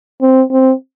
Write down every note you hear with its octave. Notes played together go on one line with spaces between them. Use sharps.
C4
C4